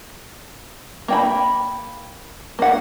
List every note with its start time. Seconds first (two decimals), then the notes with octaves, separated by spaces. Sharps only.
1.08 A#3 G5 B5
2.59 A#3 F#5